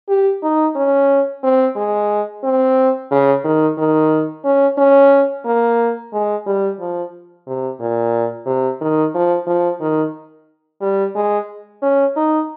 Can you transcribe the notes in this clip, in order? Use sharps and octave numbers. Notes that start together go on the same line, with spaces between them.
G4
D#4
C#4
C4
G#3
C4
C#3
D#3
D#3
C#4
C#4
A#3
G#3
G3
F3
C3
A#2
C3
D#3
F3
F3
D#3
G3
G#3
C#4
D#4